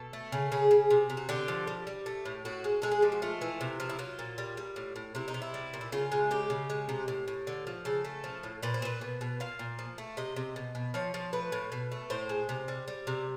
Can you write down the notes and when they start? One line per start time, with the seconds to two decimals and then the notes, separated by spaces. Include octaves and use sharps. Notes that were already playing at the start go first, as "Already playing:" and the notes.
Already playing: B2 A4
0.13 A3
0.32 C#3
0.52 C#3 G#4
0.71 C#3
0.90 C3
1.10 C3
1.17 F#4
1.29 D3 G4
1.48 F3
1.67 G3
1.87 G3
2.06 A3
2.25 A2
2.45 A2 F#4
2.64 G#3
2.82 G#3 A4
2.92 G#4
3.02 F3 G4
3.12 F#4
3.22 A3 F4
3.41 E3
3.61 C3
3.80 F3
3.89 E4
3.99 F#3 F4
4.19 A#2
4.38 G3
4.57 G3
4.76 A2
4.96 A2
5.15 C3 E4
5.28 D#4
5.34 C3
5.42 E4
5.54 G3
5.74 A#2
5.81 E4
5.92 C#3 F4
6.12 G#3
6.31 C#3 G4
6.50 C#3
6.70 G#3
6.89 C3
7.08 A2
7.28 A2
7.47 D3
7.67 F3
7.85 C#3 A4
8.05 A3
8.24 F3
8.43 A2
8.63 A#2 B4
8.74 C5
8.82 A#2 B4
9.01 B2
9.21 B2
9.40 A#2 F5
9.59 A#2
9.79 F3
9.98 A3
10.17 C3 D#5
10.36 C3
10.56 B2
10.75 B2
10.94 F3 C#5
11.14 F3
11.33 A3 B4
11.52 A2
11.72 B2
11.92 A3
12.10 A2 C5
12.29 G#3
12.49 C3
12.68 G3
12.88 G3
13.07 C3